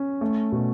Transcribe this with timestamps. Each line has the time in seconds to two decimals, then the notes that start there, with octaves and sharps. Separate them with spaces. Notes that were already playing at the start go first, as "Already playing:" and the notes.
Already playing: C#4
0.21 A3
0.52 B2